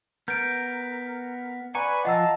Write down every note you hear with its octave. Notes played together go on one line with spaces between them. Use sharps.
B3 A#4 G6 D7
B4 D5 F#5 G#5 A#5 B5 C#6
F3 F4 D#5 F#5 A5 A#5 E6